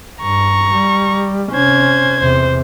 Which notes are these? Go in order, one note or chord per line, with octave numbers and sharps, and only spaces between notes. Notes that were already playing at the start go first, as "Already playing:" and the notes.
G2 A#5 C#6
G3
C3 C#4 C5 G#6
E2 C3 C5